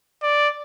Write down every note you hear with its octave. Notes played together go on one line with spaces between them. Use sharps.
D5